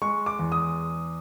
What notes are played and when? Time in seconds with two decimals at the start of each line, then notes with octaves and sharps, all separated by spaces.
0.02 G#3 C#6
0.26 D6
0.39 E2
0.52 D#6